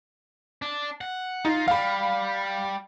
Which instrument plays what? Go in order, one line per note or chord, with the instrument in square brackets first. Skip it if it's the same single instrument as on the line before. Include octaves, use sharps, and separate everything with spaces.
[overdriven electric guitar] D4
F#5
[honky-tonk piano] D#4 [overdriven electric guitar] F4
[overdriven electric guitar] G3 [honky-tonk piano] F5 B5